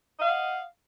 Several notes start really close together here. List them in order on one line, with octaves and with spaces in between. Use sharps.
D#5 F5 F#5